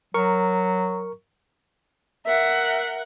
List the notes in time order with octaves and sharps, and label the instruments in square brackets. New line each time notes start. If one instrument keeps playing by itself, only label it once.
[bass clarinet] F#3 [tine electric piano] A#4 C#6
[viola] A#4 F#5 [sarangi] E5